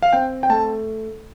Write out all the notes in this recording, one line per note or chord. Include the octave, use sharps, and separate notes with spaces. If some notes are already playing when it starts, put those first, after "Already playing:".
F5
C4 G5
G5
A3 A5